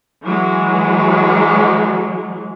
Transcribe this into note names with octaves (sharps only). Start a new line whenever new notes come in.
E3 F#3 G#3